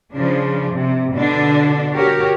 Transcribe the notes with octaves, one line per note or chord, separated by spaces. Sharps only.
C#3 F3 D4
C3
B2 D3 D4 D5
F#4 G4 A#4 C#5